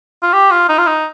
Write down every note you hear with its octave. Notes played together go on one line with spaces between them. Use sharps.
F4
G4
F4
D#4
F4
D#4